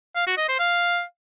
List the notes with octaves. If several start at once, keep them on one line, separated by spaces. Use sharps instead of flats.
F5
F#4
D#5
C5
F5